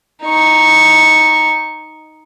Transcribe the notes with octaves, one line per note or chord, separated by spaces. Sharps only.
D#4 C#6